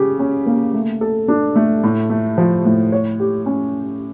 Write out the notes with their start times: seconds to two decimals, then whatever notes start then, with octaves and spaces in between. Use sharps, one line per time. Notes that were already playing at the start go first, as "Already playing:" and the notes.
Already playing: C#3 G4
0.19 C#4
0.46 A#3
0.74 A3
1.01 A4
1.28 D4
1.56 A3
1.84 A2
2.10 A3
2.38 F3
2.65 A2
2.92 C#5
3.19 G4
3.46 C#4